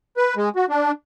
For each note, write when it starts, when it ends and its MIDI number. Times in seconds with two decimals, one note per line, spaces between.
0.17 0.35 71
0.36 0.49 56
0.56 0.66 66
0.69 0.92 62